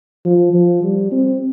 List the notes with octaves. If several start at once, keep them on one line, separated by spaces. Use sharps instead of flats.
F3
F3
G3
C4